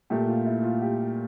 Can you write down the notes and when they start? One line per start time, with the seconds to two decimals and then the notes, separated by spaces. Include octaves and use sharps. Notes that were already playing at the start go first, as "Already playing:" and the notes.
0.10 A#2 A3 G4
0.28 F4
0.46 E4
0.63 F4
0.82 G4